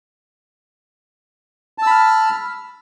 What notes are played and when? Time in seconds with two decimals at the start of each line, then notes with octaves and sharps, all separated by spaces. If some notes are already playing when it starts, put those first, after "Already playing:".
1.78 A5
1.83 E6
1.87 B5
1.91 F6